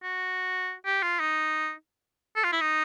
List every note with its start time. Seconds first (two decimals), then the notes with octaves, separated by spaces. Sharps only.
0.03 F#4
0.86 G4
1.03 F4
1.20 D#4
2.36 A4
2.44 F4
2.52 E4
2.61 D#4